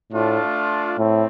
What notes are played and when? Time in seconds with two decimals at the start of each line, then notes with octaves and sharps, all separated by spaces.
0.12 A2 A3 D4 F4
0.98 A2 A3 C4